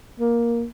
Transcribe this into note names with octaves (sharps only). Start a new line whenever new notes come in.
A#3